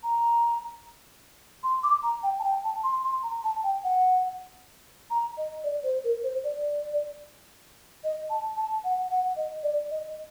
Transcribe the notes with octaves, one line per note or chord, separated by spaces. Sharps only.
A#5
C6
D6
A#5
G5
A5
G5
A5
C6
C6
A#5
A5
G5
F#5
A#5
D#5
D5
C5
A#4
C5
D5
D#5
A5
A5
F#5
F#5
D#5
D5
D#5